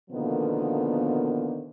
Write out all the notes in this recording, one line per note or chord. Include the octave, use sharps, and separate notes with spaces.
B2 D3 D#3 F3 A#3 B3